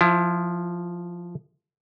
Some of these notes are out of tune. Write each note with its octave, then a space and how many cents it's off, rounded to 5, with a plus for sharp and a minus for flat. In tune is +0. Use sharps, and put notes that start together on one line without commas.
F3 +0 E4 +25